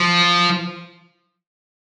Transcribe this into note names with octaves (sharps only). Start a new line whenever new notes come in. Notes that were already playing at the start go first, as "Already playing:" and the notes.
Already playing: F3